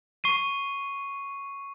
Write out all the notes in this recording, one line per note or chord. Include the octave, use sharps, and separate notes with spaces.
C#6 C7 D#7